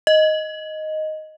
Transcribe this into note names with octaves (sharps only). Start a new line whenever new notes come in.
D#5